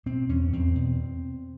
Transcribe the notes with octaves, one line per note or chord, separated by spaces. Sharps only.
B2 C4
E2 C#4
E2 C4
B2